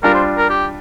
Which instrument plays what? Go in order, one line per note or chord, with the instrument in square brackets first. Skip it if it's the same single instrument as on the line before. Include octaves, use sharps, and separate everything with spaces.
[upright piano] G3 D4 F4 [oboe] A#4
[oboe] C5
A#4
G4